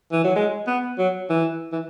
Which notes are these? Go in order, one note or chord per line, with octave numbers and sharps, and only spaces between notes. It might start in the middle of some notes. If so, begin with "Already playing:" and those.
E3
F#3
G#3
B3
F#3
E3
E3